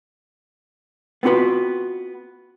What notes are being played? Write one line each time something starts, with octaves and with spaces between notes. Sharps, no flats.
B3 C4 F4 F#4 B4